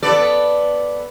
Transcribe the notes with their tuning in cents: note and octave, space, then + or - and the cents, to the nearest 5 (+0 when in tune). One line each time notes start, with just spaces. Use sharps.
B3 +0 A4 +0 D5 +0